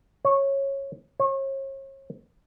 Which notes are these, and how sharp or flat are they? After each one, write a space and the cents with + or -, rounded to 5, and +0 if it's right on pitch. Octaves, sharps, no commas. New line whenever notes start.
C#5 -15
C#5 -40